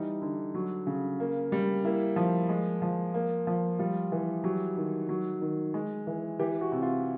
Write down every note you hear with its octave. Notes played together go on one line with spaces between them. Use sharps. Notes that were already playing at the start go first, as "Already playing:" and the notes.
Already playing: E3 G3 D#4
D3
F#3
C#3
A#3
G3
A#3 E4
F3
G#3
F3
A#3
F3
G3 F4
E3
F#3 G4
D#3
F#3
D#3
G#3
E3
E3 G4
F#4
C3
F4